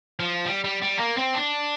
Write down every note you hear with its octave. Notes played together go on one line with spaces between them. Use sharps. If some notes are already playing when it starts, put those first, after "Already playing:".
F3
G3
G3
G3
A#3
C4
D4